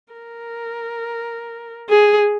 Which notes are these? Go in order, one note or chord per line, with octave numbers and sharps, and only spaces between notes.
A#4
G#4